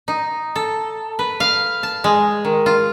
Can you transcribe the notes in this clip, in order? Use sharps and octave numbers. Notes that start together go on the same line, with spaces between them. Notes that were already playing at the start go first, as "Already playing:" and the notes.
D#4
A4
B4
F5
A5
G#3
D#3
F4